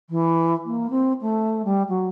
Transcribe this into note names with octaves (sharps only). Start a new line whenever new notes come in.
E3
A#3
C4
A3
G3
F#3